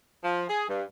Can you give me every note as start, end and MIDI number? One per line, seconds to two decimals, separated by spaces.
0.23 0.45 53
0.48 0.64 68
0.69 0.83 43